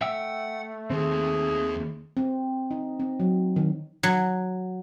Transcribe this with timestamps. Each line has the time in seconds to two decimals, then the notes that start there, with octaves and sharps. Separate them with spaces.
0.01 A3 E5 F#5 G5 E6
0.90 D#2 D#3 C4 G#4
2.17 C4
2.71 D#4
3.00 C4
3.20 F#3
3.56 D#3
4.03 F#3